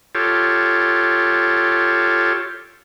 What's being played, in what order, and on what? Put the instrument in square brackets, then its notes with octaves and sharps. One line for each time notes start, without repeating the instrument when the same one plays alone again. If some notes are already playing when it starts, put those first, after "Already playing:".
[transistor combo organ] F4 G4 A4 C#5